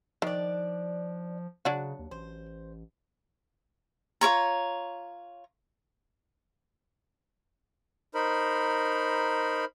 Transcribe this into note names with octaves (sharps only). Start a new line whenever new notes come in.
D#3 F3 D4 D5
C#3 F#3 D4 F#4
D#2
A1 C5
F4 A#4 C#5 A#5
D#4 A#4 C5 B5